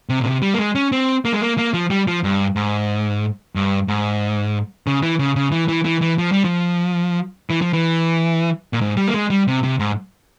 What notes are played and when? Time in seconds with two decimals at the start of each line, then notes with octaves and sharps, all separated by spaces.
0.09 C3
0.20 A#2
0.25 C3
0.42 G3
0.54 A#3
0.59 G#3
0.75 C#4
0.92 C4
1.25 A#3
1.32 G#3
1.41 A#3
1.58 A#3
1.74 F3
1.90 G3
2.07 F3
2.24 G2
2.56 G#2
3.55 G2
3.88 G#2
4.87 C#3
5.03 E3
5.19 C#3
5.36 C#3
5.52 E3
5.68 E3
5.85 E3
6.01 E3
6.18 F3
6.32 G3
6.45 F3
7.50 E3
7.62 F3
7.73 E3
8.73 A#2
8.81 G#2
8.97 G3
9.08 A#3
9.14 G#3
9.30 G3
9.47 C3
9.64 C3
9.79 G#2